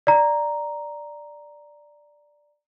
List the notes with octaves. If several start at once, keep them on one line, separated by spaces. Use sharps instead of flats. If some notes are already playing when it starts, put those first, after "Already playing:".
D5 A#5